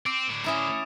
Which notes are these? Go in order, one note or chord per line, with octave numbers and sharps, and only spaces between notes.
C4 D6 D7
A2 D3
C#4 E4 A#5 D#6 E7